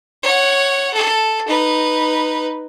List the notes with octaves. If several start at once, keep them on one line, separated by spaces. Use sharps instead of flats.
C#5 F#5
A4
D#4 B4